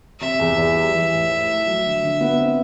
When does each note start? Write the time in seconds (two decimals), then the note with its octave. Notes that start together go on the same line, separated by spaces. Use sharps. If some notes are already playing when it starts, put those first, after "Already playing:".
0.20 C3 E5
0.39 E2
0.57 E2
0.76 G3
0.93 E3
1.12 A2
1.31 E4
1.48 A3
1.67 F#3
1.85 D3
2.03 D3
2.21 B3
2.40 C4